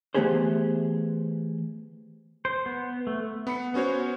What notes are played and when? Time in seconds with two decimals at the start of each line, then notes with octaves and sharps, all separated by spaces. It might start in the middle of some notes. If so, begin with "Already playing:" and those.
0.15 E3 A3 B3 G4 G#4 C5
2.45 C5
2.66 B3
3.07 A3
3.47 B3 B5 C#7
3.74 B3 C#4 F#4 C5 C#5